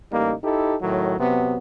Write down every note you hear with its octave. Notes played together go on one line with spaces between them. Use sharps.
A1 G3 A#3 D#4
D#4 E4 G4 A4
A2 D#3 F#3
C3 F#3 B3